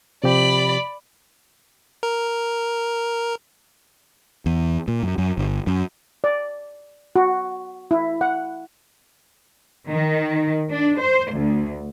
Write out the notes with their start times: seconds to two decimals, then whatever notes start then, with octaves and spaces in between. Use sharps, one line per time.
0.24 C3 F3 G4 D5 B5
2.03 A#4
4.46 E2
4.88 A#2
5.03 F#2
5.18 F#2
5.37 G1
5.67 F#2
6.24 D5
7.16 F#4
7.91 E4
8.21 F#5
9.88 D#3
10.70 D4
11.01 C5
11.33 D2